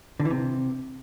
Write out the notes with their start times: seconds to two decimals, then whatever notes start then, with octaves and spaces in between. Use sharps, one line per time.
0.20 D3
0.25 E3
0.31 C3